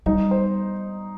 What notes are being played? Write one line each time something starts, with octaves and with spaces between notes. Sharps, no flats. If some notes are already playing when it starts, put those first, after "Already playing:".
G3 D#4
C5